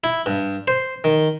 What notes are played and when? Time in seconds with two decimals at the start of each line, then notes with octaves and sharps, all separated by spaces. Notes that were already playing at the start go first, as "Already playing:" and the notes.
0.04 E4
0.26 G2
0.68 C5
1.04 D#3